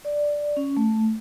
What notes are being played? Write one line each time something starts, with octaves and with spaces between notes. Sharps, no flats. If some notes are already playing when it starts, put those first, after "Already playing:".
D5
C#4
A3